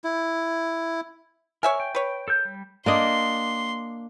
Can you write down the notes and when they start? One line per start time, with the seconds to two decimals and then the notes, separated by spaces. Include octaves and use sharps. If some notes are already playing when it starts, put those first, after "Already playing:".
0.04 E4
1.63 A#4 C#5 E5 G#5
1.80 G5
1.95 B4 C#5
2.28 A4 A#4 G6
2.45 G3
2.86 A#3 D4 D#5 C6